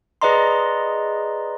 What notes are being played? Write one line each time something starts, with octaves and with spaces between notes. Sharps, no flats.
G#4 B4 D5 D#5 A#5 C6